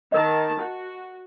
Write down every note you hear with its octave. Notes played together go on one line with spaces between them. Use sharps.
D#3 A#4 D#5 A5
F#4